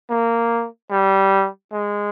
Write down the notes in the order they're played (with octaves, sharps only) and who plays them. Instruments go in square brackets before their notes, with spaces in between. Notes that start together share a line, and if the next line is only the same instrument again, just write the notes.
[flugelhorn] A#3
G3
G#3